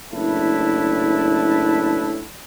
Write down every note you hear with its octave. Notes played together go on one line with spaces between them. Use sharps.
F#1 A2 D4 E4 B4 A5